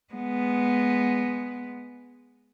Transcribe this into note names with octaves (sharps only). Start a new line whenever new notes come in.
G#3 B3